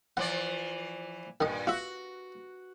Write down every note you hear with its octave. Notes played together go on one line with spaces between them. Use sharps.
E3 F3 D5 F#5
G2 A#2 D#3 D#5
F4 F#4 E5